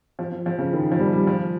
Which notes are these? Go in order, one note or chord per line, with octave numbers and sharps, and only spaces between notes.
F3
F3
F3
C#3
D#3
F3
G3
G3
F3